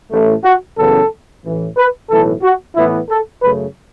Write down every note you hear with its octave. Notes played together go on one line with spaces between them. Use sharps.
A1 A2 A3
F#4
F#2 C#3 E3 B3 A4
A1 A2 E3
B4
B1 A2 E3 A3 A4
F#4
A2 E3 B3 E4
A4
F#2 C#3 A3 B4